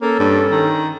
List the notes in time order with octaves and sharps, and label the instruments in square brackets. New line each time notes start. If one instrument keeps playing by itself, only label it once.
[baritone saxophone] A#3 [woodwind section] C#4 A4
[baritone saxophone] G2
D#3